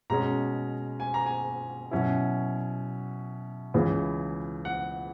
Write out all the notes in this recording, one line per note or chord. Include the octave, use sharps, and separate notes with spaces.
B2 G#3 C#4 A#5
G#5
A#5
G#5
B2 F#3 C#4 E4
C#2 C#3 E3
F#5